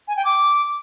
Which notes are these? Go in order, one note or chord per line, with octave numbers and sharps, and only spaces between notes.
G#5
G5
D6